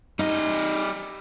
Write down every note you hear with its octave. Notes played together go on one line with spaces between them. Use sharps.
G3 D#4 D#5